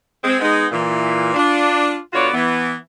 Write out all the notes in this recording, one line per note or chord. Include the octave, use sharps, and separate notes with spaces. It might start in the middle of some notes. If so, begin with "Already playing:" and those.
G#3 C4
G#3 B3 D#4
A#2 E3
D4 F4
D3 B3 F4 F#4 C#5 D5
E3 B3